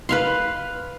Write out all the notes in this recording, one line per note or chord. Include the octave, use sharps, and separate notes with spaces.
B4 F5 C6